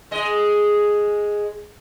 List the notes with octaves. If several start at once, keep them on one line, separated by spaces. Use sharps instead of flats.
G#3 D#5